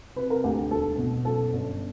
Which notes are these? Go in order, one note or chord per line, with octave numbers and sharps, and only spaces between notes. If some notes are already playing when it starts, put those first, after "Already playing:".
C3 B4
A#4
D2 G4
E1 A4
B2
F#2 A4
G1